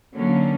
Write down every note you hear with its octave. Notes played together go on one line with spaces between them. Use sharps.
D3 F#3 A#3 C#4